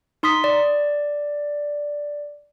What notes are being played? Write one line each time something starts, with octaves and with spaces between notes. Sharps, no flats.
D#4 C6 D#6 B6
D5